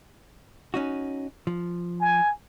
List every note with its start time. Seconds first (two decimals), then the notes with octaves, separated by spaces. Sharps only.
0.74 C#4 D#4 F#4
1.47 F3
2.00 G#5